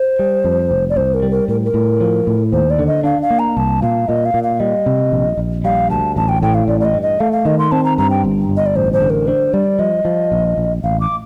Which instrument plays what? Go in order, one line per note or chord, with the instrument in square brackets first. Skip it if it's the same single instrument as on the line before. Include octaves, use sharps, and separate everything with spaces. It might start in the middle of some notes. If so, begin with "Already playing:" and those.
Already playing: [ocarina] C5
[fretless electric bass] G3
F2
F1
[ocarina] D5
[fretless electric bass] C2 [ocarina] C5
[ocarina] A#4
[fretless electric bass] G3
[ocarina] A#4
[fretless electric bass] A2 [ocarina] A#4
[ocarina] A#4
[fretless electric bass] A2
F3
A2
[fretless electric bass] D#2 [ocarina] C5
[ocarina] D5
[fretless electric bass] D3
[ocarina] D#5
[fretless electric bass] D4 [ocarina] F5
[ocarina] F5
[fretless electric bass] A#3
[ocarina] A#5
[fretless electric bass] C2 [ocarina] A5
[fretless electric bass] A#2 [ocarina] F5
[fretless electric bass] A#2 [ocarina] D#5
[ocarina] F5
[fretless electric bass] A#2
[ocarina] F5
[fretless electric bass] G3 [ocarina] D#5
[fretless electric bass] C3
A#1
A#1
[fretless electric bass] G3 [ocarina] F5
[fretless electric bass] D2 [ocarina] A5
[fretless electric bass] A1 [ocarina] A5
[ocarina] G5
[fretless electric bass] A2 [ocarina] G5
[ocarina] F5
[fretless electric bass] A1 [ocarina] D5
[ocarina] D5
D#5
[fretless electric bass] G2
[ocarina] D#5
[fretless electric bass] A3 [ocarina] F5
[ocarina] F5
[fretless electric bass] D#3 [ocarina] D#5
[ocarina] C6
[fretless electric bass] C4 [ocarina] A5
[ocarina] A#5
[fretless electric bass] G2 [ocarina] A#5
[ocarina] G5
[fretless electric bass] G1
G1
[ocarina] D#5
D5
[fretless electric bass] A1 [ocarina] C5
[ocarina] C5
[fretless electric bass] D3
[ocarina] A#4
[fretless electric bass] D4 [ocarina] C5
[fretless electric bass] G3 [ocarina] D5
[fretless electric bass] F3 [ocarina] D#5
[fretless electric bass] F3
A#1
A#1
[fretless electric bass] A1 [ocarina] F5
[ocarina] D6